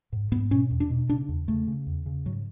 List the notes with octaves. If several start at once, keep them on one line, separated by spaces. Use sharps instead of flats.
G#2
G#2 B3
B2 C#4
E2
D4
B2
C#3 D4
E2
C#3 A3
C#3
E2
C#3
G#2 F#3